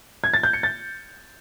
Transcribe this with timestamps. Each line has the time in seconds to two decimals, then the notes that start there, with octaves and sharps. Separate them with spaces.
0.24 G#6
0.34 A6
0.43 G6
0.53 C#7
0.63 A6